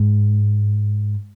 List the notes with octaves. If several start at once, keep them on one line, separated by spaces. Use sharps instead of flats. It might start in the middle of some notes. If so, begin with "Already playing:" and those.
Already playing: G#2